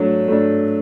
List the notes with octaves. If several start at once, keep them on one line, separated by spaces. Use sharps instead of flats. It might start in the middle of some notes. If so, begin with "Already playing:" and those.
Already playing: F#3 A3 D4
A3 D4